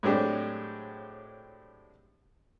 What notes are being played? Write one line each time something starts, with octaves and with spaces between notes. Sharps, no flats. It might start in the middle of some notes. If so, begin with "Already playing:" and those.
A2 F#3 G#3 C4 D4 G4